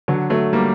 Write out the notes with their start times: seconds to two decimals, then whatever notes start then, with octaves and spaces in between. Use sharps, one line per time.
0.08 D3 F#3
0.30 F#3 A3
0.53 G3 A#3